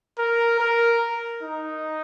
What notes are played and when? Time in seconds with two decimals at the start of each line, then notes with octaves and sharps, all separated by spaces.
0.19 A#4
0.60 A#4
1.43 D#4